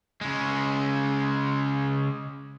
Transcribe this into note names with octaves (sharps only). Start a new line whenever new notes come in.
C#3 G#3